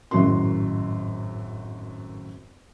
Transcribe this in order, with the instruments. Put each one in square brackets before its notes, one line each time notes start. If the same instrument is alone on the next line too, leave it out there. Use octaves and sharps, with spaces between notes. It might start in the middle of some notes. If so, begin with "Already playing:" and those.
[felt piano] G#1 F#2 A2 F#4 A#4 C6